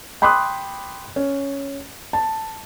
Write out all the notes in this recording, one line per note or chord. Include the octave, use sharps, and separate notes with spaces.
G5 B5 C6 D6 D#6 F#6
C#4
A5